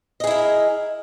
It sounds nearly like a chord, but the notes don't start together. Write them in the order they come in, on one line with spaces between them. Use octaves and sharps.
D#5 G#4 E4 A#4